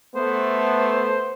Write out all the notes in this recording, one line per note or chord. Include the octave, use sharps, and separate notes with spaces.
A3 B3 C5